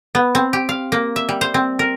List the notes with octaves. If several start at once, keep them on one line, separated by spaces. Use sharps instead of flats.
B3
C4
G4
F5
A#3
E5
G3
C5
C4
A#4